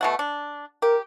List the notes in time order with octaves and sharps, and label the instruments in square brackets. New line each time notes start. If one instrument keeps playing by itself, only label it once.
[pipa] B2 A3 F#5
D4
[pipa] G4 [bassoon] A#4